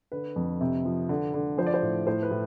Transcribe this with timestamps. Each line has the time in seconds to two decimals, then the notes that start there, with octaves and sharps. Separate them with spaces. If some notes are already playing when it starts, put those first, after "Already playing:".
0.12 D3 B4
0.36 F2
0.61 C3
0.85 F3
1.09 D3
1.34 D3
1.58 F3 C5
1.67 D5
1.74 C5
1.82 A2
2.07 A2 C5
2.22 B4
2.31 A2